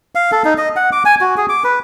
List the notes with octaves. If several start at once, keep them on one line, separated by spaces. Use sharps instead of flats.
F5
A4
D#4
D#5
F#5
D6
G#5
F#4
G#4
D6
B4